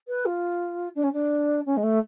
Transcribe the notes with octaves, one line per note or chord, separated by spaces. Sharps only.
B4
F4
D4
C#4
D4
C#4
G#3
A3